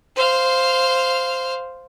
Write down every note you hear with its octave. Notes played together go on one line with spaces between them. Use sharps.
C5 F5